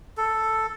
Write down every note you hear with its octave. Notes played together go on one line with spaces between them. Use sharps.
A4